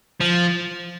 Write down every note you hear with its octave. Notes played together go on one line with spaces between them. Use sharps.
F3